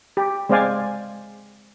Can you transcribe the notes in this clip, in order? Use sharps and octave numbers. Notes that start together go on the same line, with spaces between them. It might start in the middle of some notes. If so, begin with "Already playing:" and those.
G4
G#3 C4 C5 D5 F5 G#5